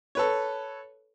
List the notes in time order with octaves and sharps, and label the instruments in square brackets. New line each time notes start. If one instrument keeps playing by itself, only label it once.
[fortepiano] A4 B4 C#5